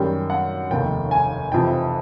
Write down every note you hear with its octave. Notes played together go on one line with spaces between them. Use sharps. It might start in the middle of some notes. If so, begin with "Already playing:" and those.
Already playing: F#2 D#3 G3 G5
F#5
F1 D#2 D#3 G5
G#5
F1 F2 C3 E3 G5